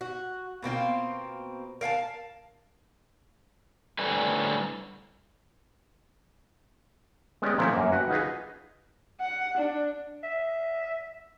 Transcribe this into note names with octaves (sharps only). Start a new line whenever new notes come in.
F#4
B2 A#3 C4 F4
A#4 F5 F#5 A5
A2 D3 G3 C4 B4 G#5
G#3 B3 C#4 G4 D5 D#5
A#2 F3 A3 C4 C#4 E4
F#2 A#3
F#4 B4 F#5 G5
D#4 F4 F#4 G#4 B4
F#5
D4
E5